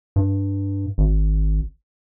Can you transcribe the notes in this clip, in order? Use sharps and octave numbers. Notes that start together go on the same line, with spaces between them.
G2
G#1